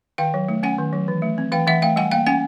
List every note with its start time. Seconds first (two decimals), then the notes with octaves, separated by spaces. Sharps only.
0.18 D#3 F5 G5
0.34 F#3
0.48 A3
0.63 C#4 F#5 G#5
0.78 D#3
0.93 F#3
1.08 E3
1.22 A3
1.38 C4
1.52 E3 F5 G5
1.67 E3 E5 F#5
1.82 A3 F5 G5
1.96 G3 F#5 G#5
2.11 A#3 F5 G5
2.27 C#4 F#5 G#5